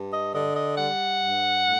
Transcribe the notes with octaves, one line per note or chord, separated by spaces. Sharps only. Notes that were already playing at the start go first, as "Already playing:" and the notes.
Already playing: G2
D#5
D3 D#5
D#5
G3 F#5
G2
A2